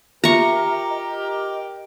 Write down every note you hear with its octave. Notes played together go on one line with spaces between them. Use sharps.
F4 G4 A#4 E5 A#5 C#6
D#5